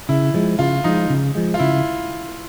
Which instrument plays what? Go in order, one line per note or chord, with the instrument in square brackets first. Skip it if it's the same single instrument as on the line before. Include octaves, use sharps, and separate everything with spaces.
[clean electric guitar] C#3 [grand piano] E4
[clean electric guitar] F3 G#3
[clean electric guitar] C#3 [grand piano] F4
[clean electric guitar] F3 G#3 [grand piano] D#4
[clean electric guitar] C#3
F3 G#3
[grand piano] F4
[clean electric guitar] C#3 [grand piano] E4